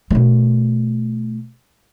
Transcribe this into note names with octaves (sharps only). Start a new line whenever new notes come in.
B2 A3